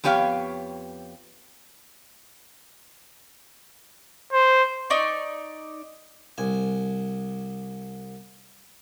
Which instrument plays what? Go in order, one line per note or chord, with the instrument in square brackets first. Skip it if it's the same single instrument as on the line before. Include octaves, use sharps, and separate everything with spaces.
[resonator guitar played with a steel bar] F2 B3 G4 C#5 F5 G5
[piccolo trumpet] C5
[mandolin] D#4 D5 C#6
[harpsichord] C2 G#5